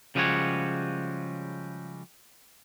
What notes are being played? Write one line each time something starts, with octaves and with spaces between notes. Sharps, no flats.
C#3 F3 G3 G#3 F#4 C#5